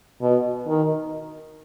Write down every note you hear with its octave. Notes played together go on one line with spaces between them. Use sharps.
B2
D#3